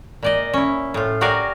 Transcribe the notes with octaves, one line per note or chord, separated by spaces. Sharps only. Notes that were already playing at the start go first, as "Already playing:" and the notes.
A#2 D5 D#5
C#4 E4
A2 F4
F#4 G4 A#4 D5 F5 G#5